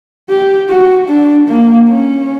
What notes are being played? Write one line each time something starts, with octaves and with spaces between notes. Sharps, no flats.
G4
F#4
D4
A#3
C#4